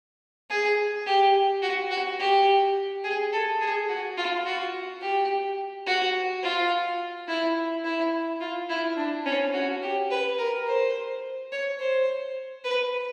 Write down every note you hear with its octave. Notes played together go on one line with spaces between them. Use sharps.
G#4
G4
F#4
F#4
G4
G#4
A4
G#4
F#4
F4
F#4
G4
F#4
F4
E4
E4
F4
E4
D4
C#4
F#4
G4
B4
A#4
C5
C#5
C5
B4